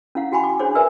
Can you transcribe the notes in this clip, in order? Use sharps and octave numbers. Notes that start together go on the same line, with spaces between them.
C#4 E4 F5 F#5
E4 F#4 G5 G#5 B5 C#6
D6
D4 G#4 C5 C#5 D6
A#4 B4 D5 E5 G#5